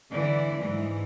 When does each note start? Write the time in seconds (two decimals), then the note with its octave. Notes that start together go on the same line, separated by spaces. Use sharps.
0.11 D3 E3 D5
0.59 G#2 E3